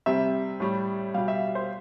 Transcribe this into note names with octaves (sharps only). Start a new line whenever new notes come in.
C3 G3 E5
A2 G3
B2 G3 F5
E5
C5